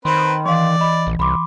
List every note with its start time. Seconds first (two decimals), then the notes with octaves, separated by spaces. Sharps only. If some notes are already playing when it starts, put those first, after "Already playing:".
0.05 D#3 C4 B4 B5 C6
0.46 E3 D5 F5 C6
0.80 D#5 B5
1.07 A#1
1.19 C2 B5 C6 D6